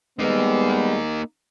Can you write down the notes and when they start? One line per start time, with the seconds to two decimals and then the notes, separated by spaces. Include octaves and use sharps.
0.19 G3 G#3 A#3 B3 D#4